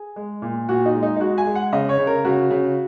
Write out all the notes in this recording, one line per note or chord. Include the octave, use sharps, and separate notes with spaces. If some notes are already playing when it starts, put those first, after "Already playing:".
Already playing: G#4
G#3
A#2
A#2 F#4
D#4
G#3
D#4
D#4
G#3 F#4
G#5
G#3
F#5
C#3 D#5
C#5
C#3
A#4
C#3 F#4
C#3